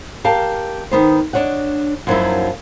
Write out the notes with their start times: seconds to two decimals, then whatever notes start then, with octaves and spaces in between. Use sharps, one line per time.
0.24 G4 A#4 F5 A5
0.91 D#3 B3 C5
1.33 D4 C#5 D#5 F#5
2.07 F#2 F3 F#3 A#3 D#4 E4